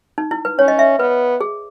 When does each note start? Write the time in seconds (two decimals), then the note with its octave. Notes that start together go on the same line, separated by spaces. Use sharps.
0.18 D#4
0.31 E4
0.45 B4
0.59 C#4 C#5
0.68 D#5
0.79 E5
0.99 B3 B4
1.41 G#4